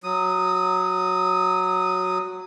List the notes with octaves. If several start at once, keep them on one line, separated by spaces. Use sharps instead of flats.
F#3 D#6